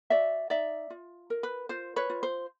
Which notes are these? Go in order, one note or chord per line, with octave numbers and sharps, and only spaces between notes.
F#4 D5 E5
D#4 D5 E5
F4
A#4
B4
F4 C5
B4 C#5
F4
C5